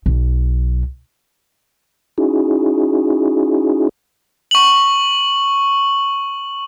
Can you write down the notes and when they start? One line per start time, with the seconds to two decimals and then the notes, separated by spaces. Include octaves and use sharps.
0.06 B1
2.18 C#4 D#4 E4 F#4 G#4
4.51 C#6 F#7